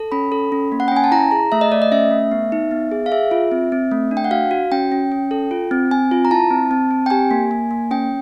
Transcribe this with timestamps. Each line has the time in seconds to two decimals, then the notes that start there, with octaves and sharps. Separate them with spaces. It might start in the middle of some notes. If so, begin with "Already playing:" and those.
Already playing: A4
0.12 C#4 B5
0.32 A4
0.52 C#4
0.72 A#3
0.80 F#5
0.88 G5
0.91 C#4 G#5
1.04 A5
1.12 E4 A#5
1.31 G#4 A#5
1.52 A3 E5
1.61 D#5
1.72 A3 D5
1.82 D#5
1.92 C#4 E5
2.11 A3
2.31 B3
2.52 D#4
2.71 B3
2.92 G#4
3.06 F5
3.11 G#4 E5
3.31 F4
3.51 C4
3.72 C4
3.91 A3
4.11 D4
4.17 G5
4.24 F#5
4.31 F#4 F5
4.51 F#4
4.72 C#4 G5
4.92 C#4
5.12 C#4
5.31 A4
5.51 F4
5.71 C4
5.91 C4 G#5
6.11 F4
6.25 A#5
6.31 E4 A5
6.51 C4
6.71 C4
6.91 C4
7.06 G5
7.10 G4 G#5
7.31 A#3
7.51 A#3
7.71 A#3
7.91 C#4 G5